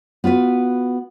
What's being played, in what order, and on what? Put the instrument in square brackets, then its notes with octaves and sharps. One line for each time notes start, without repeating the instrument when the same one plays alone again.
[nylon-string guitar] B3 F4 F#4 B4